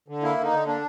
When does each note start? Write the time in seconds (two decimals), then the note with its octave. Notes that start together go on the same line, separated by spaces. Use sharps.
0.08 D3
0.22 A#3 E4
0.38 D3
0.44 D#4
0.52 D3
0.66 A#3 D4